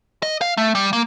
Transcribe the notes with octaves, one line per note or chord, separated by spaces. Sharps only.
D#5
F5
A3
G3
A#3